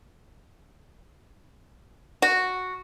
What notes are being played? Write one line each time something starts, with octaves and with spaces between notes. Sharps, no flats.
F#4